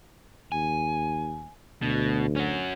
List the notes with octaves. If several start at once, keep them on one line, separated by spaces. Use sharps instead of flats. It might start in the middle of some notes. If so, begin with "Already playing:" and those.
D#2 G#5
D2 B2
C#4 F#4